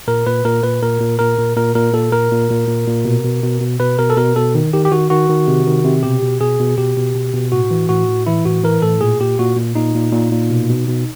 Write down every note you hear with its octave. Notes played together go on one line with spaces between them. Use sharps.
A#2 A#4
A#2 B4
A#2 A#4
A#2 B4
A#2 A#4
A#2
A#2 A#4
A#2
A#2 A#4
A#2 A#4
A#2 A4
A#2 A#4
A#2
A#2
A#2
A#2
B2
B2
B2
B2
B2 B4
B2 A#4
A4
B2 A#4
B2 A4
D#3
D#3 G4
G4
D#3 F#4
D#3 F#4
D#3
C3
D#3
C3
B2 G4
B2
B2 G#4
B2
B2 G4
B2
B2
B2
A2 F#4
E3
A2 F#4
A2
E3 E4
A2 F#4
E3 A#4
A2 A4
A#2 G#4
A#2 G4
A#2 F#4
A#2
A#2 D#4
A#2
A#2
A#2
B2
B2
B2